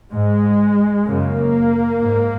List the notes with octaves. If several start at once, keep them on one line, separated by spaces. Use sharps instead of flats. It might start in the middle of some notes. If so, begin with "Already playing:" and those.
G#2 G#3
F#2 C#3 A#3
G#2